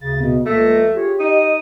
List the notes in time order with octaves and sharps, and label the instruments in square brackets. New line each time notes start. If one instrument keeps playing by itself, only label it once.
[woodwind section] D2 C#3 [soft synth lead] A6
[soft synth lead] B2
[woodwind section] C#2 F3 A#3 [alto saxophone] A3 [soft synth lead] A#6
[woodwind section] F4 G#4 C#5 [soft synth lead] G4
[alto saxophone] D#4 [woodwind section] D#5 D#6